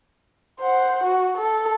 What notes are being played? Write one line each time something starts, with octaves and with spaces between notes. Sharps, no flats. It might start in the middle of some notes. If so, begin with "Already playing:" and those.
C5 F#5
F#4
A4